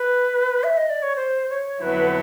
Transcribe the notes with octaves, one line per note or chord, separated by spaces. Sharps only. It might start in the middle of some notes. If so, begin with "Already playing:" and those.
Already playing: B4
E5
D#5
D5
C#5
C5
C#5
F2 D3 F#3 B3 E4 B4